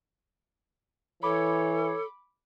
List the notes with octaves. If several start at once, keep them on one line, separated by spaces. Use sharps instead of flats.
E3 A4 C#5 B5 D6